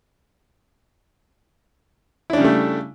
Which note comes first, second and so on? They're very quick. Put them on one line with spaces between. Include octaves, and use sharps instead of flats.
E4 D4 C#3 G3 A3